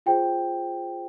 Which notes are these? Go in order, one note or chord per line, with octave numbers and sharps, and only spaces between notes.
F4 G#4 C5 G5